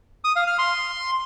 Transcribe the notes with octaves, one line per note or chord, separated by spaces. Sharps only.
D#6
F5
F6
C6